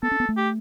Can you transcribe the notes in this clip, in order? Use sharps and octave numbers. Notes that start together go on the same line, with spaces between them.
B3 A4
C#4
B3
A3
G4